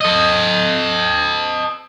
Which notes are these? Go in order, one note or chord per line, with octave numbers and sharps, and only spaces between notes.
A4 D#5